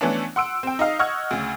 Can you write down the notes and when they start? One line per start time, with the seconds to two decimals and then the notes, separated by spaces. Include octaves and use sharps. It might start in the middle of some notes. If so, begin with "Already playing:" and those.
0.01 E3 A3 B3 C#4 D4
0.36 F#5 C6 E6 D7
0.63 C4 G5
0.79 D#4 D#5 F5
0.99 D#5 F#5 C#6 E6 F6 G#6
1.31 D2 C#3